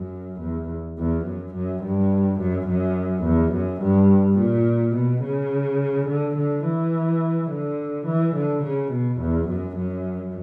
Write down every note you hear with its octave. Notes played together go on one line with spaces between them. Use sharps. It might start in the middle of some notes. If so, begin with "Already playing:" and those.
Already playing: F#2
E2
E2
F#2
F#2
G2
F#2
F#2
E2
F#2
G2
A#2
B2
C#3
D3
D3
E3
D3
E3
D3
C#3
B2
E2
F#2
F#2